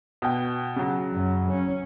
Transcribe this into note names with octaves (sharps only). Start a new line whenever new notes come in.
B2 G5
C#3 F#3
F#2
C#4